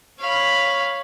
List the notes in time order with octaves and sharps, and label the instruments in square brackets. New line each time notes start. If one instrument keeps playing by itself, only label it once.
[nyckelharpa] C#5 [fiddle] F5 B5